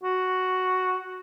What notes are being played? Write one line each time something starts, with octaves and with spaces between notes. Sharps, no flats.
F#4